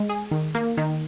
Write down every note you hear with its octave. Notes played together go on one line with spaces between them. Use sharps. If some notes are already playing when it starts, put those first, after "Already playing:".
Already playing: G#3
G#4
D#3
A#3
D#3